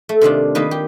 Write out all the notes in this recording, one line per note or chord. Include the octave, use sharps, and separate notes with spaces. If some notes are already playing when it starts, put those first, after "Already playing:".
A3
C3 D#3 D4 F4
D#3 A#3 D#4 B4
G4